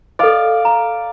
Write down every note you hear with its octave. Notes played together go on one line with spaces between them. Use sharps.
A4 D5 D#5 F5
A#5